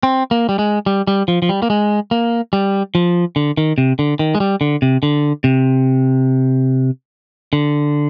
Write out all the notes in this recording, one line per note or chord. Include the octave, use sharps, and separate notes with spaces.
C4
A#3
G3
G#3
G3
G3
F3
F3
G3
A#3
G#3
A#3
G3
F3
D3
D#3
C3
D3
D#3
G#3
G3
D3
C3
D3
C3
D3